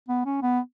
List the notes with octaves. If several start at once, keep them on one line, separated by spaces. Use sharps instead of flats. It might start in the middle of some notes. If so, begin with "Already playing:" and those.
B3
C#4
B3